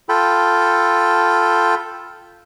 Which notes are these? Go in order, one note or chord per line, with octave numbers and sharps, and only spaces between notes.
F4 A4 G5 B5